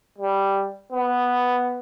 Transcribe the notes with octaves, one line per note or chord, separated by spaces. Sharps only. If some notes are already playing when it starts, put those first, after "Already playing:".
G3
B3